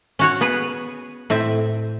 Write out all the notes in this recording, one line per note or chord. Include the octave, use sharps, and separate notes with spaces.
C#4 F#4 C#5
B3 G#4 B4
A2 C4 E5